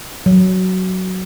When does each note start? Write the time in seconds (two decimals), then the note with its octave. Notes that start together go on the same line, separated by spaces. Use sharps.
0.26 F#3